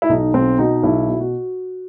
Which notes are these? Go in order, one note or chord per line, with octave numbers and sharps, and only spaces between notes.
E4
B1 D#4
B1 C4
B2 D#4
B1 E4
B2
F#4